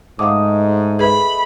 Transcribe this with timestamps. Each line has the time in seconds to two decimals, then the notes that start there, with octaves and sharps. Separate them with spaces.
0.19 G#2 A3 D#5 F5 F#5 D6
0.99 G#4 B4 E5 B5